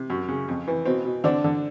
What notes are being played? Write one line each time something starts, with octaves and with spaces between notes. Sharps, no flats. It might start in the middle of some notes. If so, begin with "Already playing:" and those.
Already playing: C3
F#2
C#3
F2
E3
B2 C4
B2
D3 C4 D4
D3